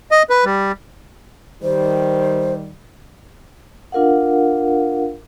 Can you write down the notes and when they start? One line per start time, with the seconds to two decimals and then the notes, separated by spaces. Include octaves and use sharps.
0.11 D#5
0.30 B4
0.45 G3
1.62 D#3 G3 C5
3.92 D4 F4 A#4 F5 F#5